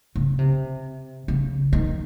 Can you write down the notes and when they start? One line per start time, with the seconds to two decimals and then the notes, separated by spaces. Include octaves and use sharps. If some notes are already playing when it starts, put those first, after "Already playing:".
0.16 C#3
0.39 C3
1.28 C#3
1.73 D#3